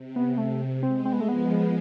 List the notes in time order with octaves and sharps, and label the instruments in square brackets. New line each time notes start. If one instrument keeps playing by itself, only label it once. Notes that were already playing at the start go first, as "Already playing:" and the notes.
Already playing: [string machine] C3
[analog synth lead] B3
[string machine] C3 [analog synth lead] A3
[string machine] G#3 [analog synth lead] C4
[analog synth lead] C4
B3
A3
[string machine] F3 [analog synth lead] B3